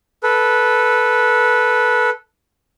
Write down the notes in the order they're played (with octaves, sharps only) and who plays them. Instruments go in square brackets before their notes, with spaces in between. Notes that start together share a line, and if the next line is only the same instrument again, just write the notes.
[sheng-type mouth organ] A4 B4